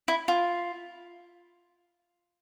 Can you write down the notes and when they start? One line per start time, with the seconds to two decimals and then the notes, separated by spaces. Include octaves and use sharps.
0.08 E4
0.28 F4